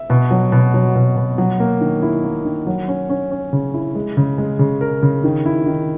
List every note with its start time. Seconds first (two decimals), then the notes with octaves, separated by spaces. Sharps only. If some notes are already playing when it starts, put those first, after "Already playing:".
Already playing: E5
0.10 B2
0.31 F#3
0.52 B2
0.74 F#3
0.95 B2
1.17 B2
1.38 F#3
1.60 A#3
1.81 D#3
2.02 E4
2.24 A#3
2.45 D#3
2.67 F#3
2.88 C#4
3.09 C#4
3.31 C#4
3.53 C#3
3.74 E4
3.95 G#3
4.17 C#3
4.38 G#3
4.59 C#3
4.81 A#4
5.02 C#3
5.24 D#3
5.46 E4
5.66 D#3